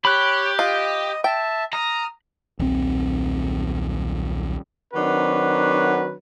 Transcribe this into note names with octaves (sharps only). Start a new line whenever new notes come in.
G4 C#5 B5 D6 F#6
F4 D#5
E5 G5 A5
A#5 D#6 F6
D#1 B1 C4
D#3 F#3 C4 D4 F#4 B4